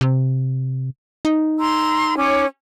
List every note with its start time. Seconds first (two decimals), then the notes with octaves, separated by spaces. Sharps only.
0.01 C3
1.25 D#4
1.58 A#5 C6 E6
2.17 C#4 C#5 D6